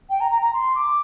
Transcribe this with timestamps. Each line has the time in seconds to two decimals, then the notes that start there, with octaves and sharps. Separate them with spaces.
0.09 G5
0.20 A#5
0.31 A#5
0.42 A#5
0.53 C6
0.75 D6